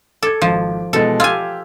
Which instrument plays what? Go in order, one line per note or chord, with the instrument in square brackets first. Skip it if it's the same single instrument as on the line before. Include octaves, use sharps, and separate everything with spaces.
[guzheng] A4 [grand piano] D6 G#6
[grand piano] G#1 [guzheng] F3
[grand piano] B2 E3 G#3 [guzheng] A4
[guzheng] F4 G#5 [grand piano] G4 E6 G#6